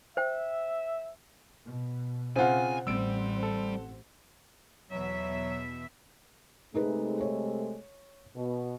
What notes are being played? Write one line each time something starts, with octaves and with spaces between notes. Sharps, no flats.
C5 E5 G5
B2
C#3 C4 F4 C5 F#5 G#5
A1 G3 C4 E6 D7
A4
E2 B2 F#3 E5
C3 G#3 A3 D#4 G#4 B4
C#5
B2